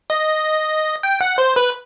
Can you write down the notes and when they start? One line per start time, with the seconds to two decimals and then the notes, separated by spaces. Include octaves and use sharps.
0.10 D#5
1.03 G5
1.21 F#5
1.38 C5
1.56 B4